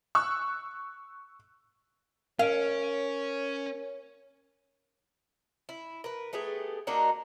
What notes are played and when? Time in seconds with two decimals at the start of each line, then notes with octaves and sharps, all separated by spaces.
0.15 C#6 E6 F#6
2.39 C#4 A#4 C#5 F5 D7
5.69 E4
6.04 A#4 B4
6.33 A3 B3 G4 G#4
6.87 A#3 D4 D#4 F#4